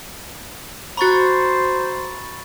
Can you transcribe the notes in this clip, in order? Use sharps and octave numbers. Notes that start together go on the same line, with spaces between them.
F#4 C5 A#5 B5 C#6 A6